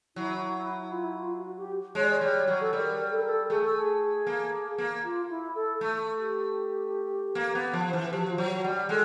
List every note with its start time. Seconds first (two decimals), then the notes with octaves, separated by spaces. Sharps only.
0.16 F#3 E4
0.42 E4
0.80 E4
0.92 F4
1.04 E4
1.18 F4
1.38 F#4
1.57 G4
1.95 G#3 C#5
2.04 D5
2.13 C#5
2.21 G3
2.48 F#3
2.61 A4
2.73 G3 A#4
3.11 A4
3.20 A#4
3.29 A4
3.49 A3 G#4
3.63 A4
3.75 G#4
4.27 A#3
4.78 A#3
5.04 F4
5.30 E4
5.55 A4
5.81 A3
6.19 G4
7.35 A#3
7.55 B3
7.73 F3
7.93 E3
8.12 F3 G4
8.21 F#4
8.30 F4
8.38 F#3 F#4
8.64 G3
8.89 G#3 A4